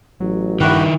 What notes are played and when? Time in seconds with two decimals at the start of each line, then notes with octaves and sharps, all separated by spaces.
0.20 A1 F#3
0.60 G2 D#3 E4 F#4 G4 B4